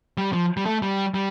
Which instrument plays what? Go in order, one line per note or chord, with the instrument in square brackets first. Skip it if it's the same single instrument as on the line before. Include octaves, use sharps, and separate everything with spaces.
[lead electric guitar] G3
F3
G3
A3
G3
G3